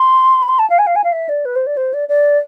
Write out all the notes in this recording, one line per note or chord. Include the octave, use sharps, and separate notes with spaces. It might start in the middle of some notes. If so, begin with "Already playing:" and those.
Already playing: C6
B5
C6
A5
F5
G#5
F5
G#5
F5
E5
D5
B4
C5
D5
C5
D5
D5